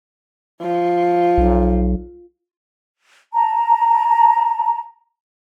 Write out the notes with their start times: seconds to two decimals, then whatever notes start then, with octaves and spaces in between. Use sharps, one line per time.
0.61 F3
1.38 B1
3.34 A5 A#5